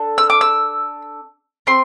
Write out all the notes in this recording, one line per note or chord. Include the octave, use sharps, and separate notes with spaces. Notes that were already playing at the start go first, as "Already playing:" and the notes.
Already playing: D4 A4
E6
D6
E6
C4 C6